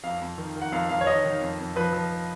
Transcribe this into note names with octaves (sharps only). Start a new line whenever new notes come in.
F2 F5
F2
D#3
D#3
F#5
F2 F5
F2 F5
C#5
D#3 D#5
D#3
F2
F2
F3 B4
F3